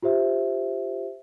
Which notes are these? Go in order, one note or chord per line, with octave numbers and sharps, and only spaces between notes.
F4 G4 C5 E5